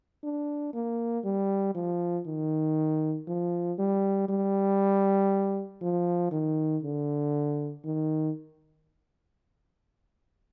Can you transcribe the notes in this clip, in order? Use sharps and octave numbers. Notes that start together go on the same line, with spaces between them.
D4
A#3
G3
F3
D#3
F3
G3
G3
F3
D#3
D3
D#3